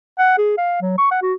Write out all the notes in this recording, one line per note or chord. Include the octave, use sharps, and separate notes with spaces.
F#5
G#4
F5
F#3
C#6
F#5
F#4